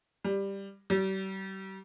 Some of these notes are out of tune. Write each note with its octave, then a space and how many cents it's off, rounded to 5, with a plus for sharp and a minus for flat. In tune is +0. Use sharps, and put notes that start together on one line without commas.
G3 +10
G3 -35